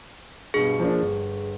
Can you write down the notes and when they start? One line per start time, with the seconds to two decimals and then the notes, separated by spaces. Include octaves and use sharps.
0.54 G2 B2 G#4
0.80 F3 A#3 D4
1.02 G1